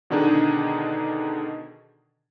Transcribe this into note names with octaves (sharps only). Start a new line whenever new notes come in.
B2 D3 D#3 D4 D#4 G#4